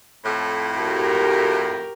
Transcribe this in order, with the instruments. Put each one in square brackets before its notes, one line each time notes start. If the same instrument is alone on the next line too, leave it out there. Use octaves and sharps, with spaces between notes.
[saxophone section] F2 A2
[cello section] F#4 G4 A#4